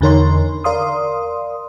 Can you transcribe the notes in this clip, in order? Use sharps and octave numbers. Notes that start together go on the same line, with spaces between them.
E2 D3 D#4 A#4 C#5 C6
A#4 D5 F5 C6 D#6